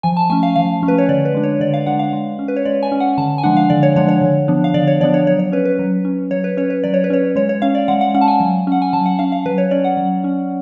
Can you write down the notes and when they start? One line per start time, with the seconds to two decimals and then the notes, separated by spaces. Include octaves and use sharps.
0.03 F3 G#5
0.17 A5
0.30 A3 C#4 G#5
0.43 F5
0.56 F3 F5
0.83 A3 C#4
0.88 B4
0.98 C#5
1.09 D3 D5
1.25 B4
1.34 G#3 D4
1.43 C#5
1.60 D3 D5
1.74 F5
1.87 G#3 D4 F#5
1.99 F5
2.13 G#3
2.39 C#4
2.48 B4
2.56 C#5
2.65 G#3 D5
2.83 G#5
2.92 C#4
3.00 F#5
3.18 D3 A5
3.38 G#5
3.43 F3 G#3 D4 F#5
3.57 F5
3.70 D3 D5
3.83 C#5
3.96 F3 G#3 D4 C#5
4.09 C#5
4.22 D3
4.48 F3 B3 D4
4.64 F5
4.74 D3 D5
4.87 C#5
5.00 F3 B3 D4 D5
5.14 C#5
5.27 F#3 C#5
5.39 C#5
5.52 C#4 B4
5.65 B4
5.79 F#3
6.05 C#4
6.31 F#3 C#5
6.44 B4
6.57 C#4 C#5
6.70 B4
6.84 F#3 D5
6.94 C#5
7.04 B4
7.10 C#4 C#5
7.36 G#3 C#5
7.49 C#5
7.62 C#4 F5
7.75 D5
7.88 G#3 F#5
8.01 F#5
8.14 C#4 F#5
8.21 A5
8.28 G#5
8.40 F#3
8.67 C#4 F#5
8.82 G#5
8.93 F#3 A5
9.06 F#5
9.19 C#4 F5
9.32 F5
9.46 F#3 B4
9.58 C#5
9.71 C#4 D5
9.84 F#5
9.97 F#3
10.24 C#4